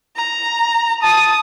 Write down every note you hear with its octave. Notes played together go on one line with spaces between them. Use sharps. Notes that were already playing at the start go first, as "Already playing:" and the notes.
A#5
A5 D#6